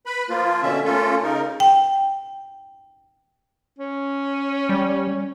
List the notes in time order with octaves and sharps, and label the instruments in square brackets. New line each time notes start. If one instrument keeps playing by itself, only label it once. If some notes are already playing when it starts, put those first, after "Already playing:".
[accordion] B4 B5
F3 A#3 F4
B2 D3 C#4 E5
A3 A#3 C#4 F4 A4
C#3 D#4 A#4
[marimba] G5
[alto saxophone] C#4
[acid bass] G3